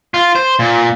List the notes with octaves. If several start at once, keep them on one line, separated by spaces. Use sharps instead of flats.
F4
C5
A#2